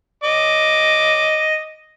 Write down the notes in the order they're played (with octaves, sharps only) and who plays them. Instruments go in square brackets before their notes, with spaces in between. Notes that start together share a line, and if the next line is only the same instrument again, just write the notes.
[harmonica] D#5 D6